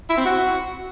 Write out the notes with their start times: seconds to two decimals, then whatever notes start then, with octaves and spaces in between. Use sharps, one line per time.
0.09 E4
0.17 C4
0.25 F#4